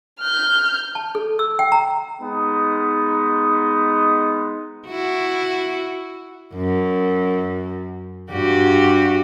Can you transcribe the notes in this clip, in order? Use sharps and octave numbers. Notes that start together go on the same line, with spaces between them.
F6 G6
A5
A4
E6
G5
A#5
G#3 B3 D#4
E4 F#4
F#2
G2 F#4 G4